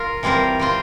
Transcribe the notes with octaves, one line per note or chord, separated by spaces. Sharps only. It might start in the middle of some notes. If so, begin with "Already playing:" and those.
Already playing: F4 A#4
E3 G3 C4 F4 A#4
G3 C4 F4